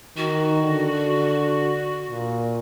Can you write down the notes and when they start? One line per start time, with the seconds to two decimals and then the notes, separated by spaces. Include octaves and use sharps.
0.17 D#3 F#4
0.62 D3
2.10 A#2